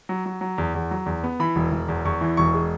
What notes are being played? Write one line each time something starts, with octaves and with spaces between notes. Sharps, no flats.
F#3
F#3
F#3
E2
E2
F#3
E2
B3
E3 B5
E1
E1
E2
E2 C#6
E3
E1 C#6
G#3